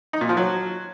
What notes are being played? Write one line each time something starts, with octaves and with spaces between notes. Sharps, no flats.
D#4
A#2
F3
F#3